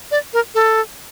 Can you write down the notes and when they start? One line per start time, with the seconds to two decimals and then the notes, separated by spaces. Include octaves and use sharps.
0.11 D5
0.33 A#4
0.55 A4